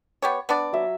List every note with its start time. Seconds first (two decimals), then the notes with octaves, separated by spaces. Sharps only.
0.22 B3 G4 C#5
0.49 B3 D4 D5
0.73 F#3 E5